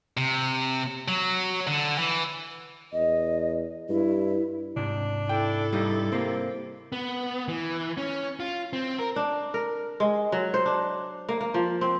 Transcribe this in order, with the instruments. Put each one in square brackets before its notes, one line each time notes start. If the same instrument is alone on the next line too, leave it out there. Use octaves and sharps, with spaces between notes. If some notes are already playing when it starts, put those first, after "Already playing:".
[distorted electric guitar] C3
F#3
D3
E3
[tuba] E2 [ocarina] D#5
[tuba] G2 [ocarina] E4
[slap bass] G#2 C3 [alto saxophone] D4
[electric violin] E4 A4 [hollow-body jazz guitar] G5
[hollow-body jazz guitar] G2 G3 D#4
[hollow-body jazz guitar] C3 A#3 [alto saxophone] C4
[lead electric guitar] B3
E3
C#4
F4
C4
A#4
[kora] D4
A#4
G#3
F#3
C5
D4
A#3
A#3
F3
C4